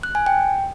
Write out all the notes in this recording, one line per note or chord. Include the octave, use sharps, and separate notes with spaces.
F#6
G#5
G5